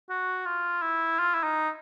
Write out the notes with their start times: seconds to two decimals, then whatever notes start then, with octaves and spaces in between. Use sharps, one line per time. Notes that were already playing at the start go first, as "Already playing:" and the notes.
0.10 F#4
0.46 F4
0.82 E4
1.19 F4
1.34 E4
1.44 D#4